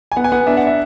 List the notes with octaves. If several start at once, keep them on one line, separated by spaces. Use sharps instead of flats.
G#5
B3 F#5
G#5
B3 F#5
D4 E5
F#5
E5